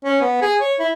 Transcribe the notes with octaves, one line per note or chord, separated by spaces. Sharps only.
C#4
B3
G#4
C#5
E4